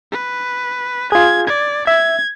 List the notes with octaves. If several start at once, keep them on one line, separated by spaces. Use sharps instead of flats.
B4
F4 G#4 G#6
D5 G#6
E5 G#6